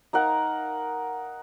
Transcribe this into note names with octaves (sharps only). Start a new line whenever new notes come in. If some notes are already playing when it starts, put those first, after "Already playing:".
D#4 A#4 F5 F#5